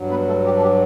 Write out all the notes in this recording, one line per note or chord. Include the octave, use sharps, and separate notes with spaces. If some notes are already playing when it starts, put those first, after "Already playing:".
Already playing: G2 F#3
B3 B4
A3 A4
G4
A4
G4